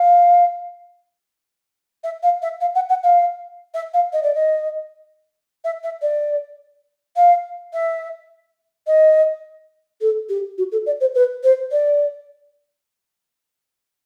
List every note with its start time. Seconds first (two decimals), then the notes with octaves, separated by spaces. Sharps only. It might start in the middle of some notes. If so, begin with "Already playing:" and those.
Already playing: F5
2.03 E5
2.22 F5
2.42 E5
2.60 F5
2.74 F#5
2.89 F#5
3.03 F5
3.74 E5
3.93 F5
4.12 D#5
4.22 D5
4.34 D#5
5.64 E5
5.83 E5
6.01 D5
7.16 F5
7.73 E5
8.86 D#5
10.01 A4
10.29 G4
10.57 F#4
10.71 A4
10.86 D5
11.00 C5
11.14 B4
11.43 C5
11.71 D5